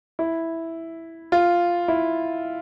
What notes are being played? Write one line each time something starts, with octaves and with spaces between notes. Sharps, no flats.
E4
F4
E4